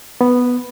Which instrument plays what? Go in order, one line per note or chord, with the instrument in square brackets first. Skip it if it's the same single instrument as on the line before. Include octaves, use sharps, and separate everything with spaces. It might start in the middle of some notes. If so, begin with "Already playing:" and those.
[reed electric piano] B3